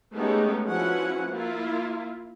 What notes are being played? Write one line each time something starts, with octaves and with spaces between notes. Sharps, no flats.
G#3 A3 B3 C#4 D#4 G4
F3 C#4 E4 F#4 B4 F#5
A#3 E4 F4